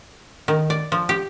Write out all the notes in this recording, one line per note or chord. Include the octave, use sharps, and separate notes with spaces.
D#3
D5
F3
G4